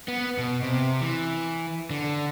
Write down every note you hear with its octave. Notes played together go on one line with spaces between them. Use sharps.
B3
B2
C3
E3
D3